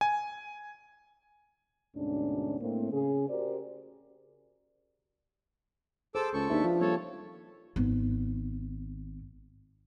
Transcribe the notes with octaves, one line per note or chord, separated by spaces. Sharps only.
G#5
D2 G#2 B2 C#4 D4
A2 A#3 C4
C#3 C#4 G#4
F#4 G4 A#4 C5 D5
G#4 A4 C5 D6 E6
C#2 A4 C#6
D#2 D4 B4 E5
F3
G3 A#3 C4 A4 C#5
G#1 B3